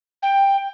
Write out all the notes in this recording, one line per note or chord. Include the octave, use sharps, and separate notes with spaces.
G5